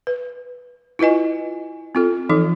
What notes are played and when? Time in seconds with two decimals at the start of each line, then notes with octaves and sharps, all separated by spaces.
0.07 B4
0.99 E4 F4 B4 D#5 G#5
1.95 C4 F4 A4
2.29 E3 F3 D#4 A4